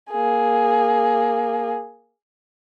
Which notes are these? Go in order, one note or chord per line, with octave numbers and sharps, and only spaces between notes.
A#3 G#4